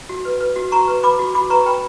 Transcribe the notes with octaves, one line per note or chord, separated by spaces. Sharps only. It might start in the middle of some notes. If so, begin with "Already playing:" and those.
F#4
B4
B4
F#4
F#4 A#5 C#6
B4
B4 B5 D6
F#4
F#4 B5 D6
B4 A#5 C#6
B4 G5 B5